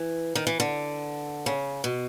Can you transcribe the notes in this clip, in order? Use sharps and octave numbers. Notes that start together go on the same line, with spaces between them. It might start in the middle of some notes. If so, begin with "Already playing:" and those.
Already playing: E3
D#3
E3
D3
C#3
B2